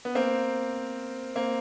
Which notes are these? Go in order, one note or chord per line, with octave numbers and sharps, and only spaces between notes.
B3
A#3 C4
A#3 C4